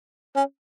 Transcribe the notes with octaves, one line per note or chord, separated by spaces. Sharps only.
C#4